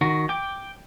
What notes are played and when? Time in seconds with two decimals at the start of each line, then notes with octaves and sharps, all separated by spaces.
0.01 D#3 F#4
0.29 G5 D6